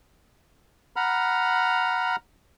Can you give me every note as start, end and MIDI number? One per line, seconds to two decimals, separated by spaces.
0.96 2.16 78
0.96 2.16 82
0.96 2.16 83
0.96 2.16 89